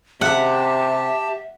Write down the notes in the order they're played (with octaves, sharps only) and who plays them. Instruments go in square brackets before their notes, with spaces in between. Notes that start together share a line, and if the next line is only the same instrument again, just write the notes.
[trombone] C3 [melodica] G4 A5 [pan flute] E5 [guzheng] F#5